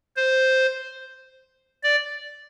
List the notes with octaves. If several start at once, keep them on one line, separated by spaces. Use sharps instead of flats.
C5
D5